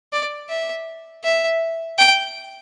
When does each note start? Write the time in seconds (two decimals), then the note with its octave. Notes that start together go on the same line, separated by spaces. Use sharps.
0.12 D5
0.49 E5
1.24 E5
1.98 G5